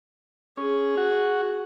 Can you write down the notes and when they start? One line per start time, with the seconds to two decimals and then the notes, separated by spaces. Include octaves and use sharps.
0.57 C#4 G#4
0.97 F#4